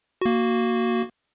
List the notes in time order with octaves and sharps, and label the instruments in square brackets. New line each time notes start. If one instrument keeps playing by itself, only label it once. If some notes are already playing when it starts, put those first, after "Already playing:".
[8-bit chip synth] A#3 F#4